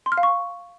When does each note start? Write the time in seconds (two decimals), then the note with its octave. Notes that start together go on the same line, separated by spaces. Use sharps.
0.06 C6
0.12 F6
0.18 F5
0.23 C#6